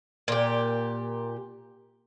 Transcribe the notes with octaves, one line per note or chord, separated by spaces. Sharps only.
A#2 G4